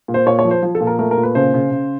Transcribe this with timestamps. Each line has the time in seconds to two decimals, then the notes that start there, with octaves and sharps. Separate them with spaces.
0.08 A#2
0.14 C5
0.26 A#2 C#5
0.39 C#5
0.44 F3
0.51 C5
0.62 F3
0.75 A4
0.81 A#2
0.87 A#4
0.99 A3 A#4
1.11 A#4
1.17 A#2
1.23 B4
1.35 C#3 C5
1.54 C#3
1.71 C#3